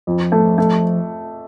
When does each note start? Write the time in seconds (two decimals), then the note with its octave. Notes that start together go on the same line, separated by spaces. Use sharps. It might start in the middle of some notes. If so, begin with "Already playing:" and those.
0.07 F2 F3
0.32 A3
0.58 A3